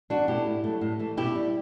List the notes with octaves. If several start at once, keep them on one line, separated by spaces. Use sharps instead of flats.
E2 D4 F#4
B2 A3 E4 G4
A2
F#3 A3
A2
E3 A3
B2 E4 G4
G3